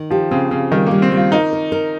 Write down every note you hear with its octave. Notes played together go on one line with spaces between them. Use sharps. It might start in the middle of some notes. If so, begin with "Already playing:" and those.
Already playing: D#3
F3 G4
C#3 C4
C#3 C4
D#3 G3
G3 A#3
C4
G3
F4
D#4 A#4
A#4
A#4